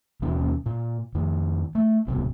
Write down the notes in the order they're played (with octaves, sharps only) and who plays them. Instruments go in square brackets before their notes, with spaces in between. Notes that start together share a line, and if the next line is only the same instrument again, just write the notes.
[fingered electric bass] D#2 B2 E3 C#4
A#2
F2 D#3
A3
D1 C2 B2